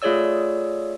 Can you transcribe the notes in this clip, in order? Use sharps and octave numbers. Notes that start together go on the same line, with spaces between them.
A3 F4 G#4 C#5 D5 E6